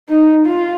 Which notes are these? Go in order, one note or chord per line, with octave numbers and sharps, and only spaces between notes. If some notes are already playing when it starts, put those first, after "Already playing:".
D#4
F4